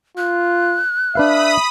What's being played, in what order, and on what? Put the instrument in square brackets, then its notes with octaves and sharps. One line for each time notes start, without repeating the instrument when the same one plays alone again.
[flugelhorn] F4 [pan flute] F#6
[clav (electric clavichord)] D4 B4 F5 [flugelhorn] E5 [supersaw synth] B5 D#6